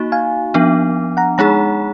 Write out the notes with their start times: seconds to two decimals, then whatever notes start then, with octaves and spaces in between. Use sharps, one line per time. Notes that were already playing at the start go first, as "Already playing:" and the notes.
Already playing: A#3 D#4 F#4
0.12 F5 G#5
0.54 F3 B3 D4
1.17 F#5 A#5
1.38 G#3 D#4 G#4 F#5 A#5